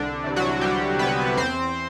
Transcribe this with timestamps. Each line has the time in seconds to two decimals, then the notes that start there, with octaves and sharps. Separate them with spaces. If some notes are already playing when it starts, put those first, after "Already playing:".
Already playing: C2 D3 D4
0.24 C3 E3
0.36 F#3 F#4
0.61 C2 G3 G4
0.99 C3 E3 B3 B4
1.37 E2 C4 C5